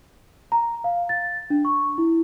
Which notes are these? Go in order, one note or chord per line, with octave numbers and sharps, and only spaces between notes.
A#5
F5
A6
D4
C#6
E4